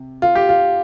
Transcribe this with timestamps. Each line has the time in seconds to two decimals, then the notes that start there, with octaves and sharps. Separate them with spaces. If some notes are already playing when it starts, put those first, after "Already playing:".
Already playing: C3
0.22 F4
0.35 G4
0.49 F4